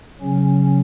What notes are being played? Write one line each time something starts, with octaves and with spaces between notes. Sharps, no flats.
C#3 F#3 C#4